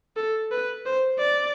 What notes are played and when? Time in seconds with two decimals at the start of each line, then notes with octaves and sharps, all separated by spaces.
0.17 A4
0.52 B4
0.86 C5
1.19 D5